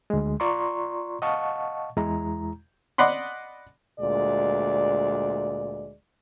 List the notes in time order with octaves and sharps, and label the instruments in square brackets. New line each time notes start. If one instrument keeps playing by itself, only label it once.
[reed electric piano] D2 G#3
F4 D5 A#5 C6 C#6
D#5 F5 F#5 A5 C#6
E2 G#3 E4 A#5
[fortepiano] D5 D#5 F#5 B5 C6
[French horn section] D2 A#2 G#3 D5